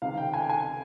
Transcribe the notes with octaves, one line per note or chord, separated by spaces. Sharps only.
C#2 C3 D#3 F5
G5
G#5
G#5